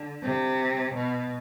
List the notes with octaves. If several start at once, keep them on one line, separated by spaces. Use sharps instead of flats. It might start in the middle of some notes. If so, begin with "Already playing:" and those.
Already playing: D3
C3
B2